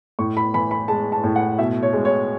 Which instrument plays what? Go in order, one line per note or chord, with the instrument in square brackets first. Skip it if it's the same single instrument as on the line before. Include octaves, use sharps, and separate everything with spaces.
[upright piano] A2 C#6
B5
E3 B5
B5
G#3 A5
A5
A2
F#5
B2 E5
C#5
G#3
C#5